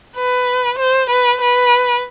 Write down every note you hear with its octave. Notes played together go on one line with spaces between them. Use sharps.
B4
C5
B4
B4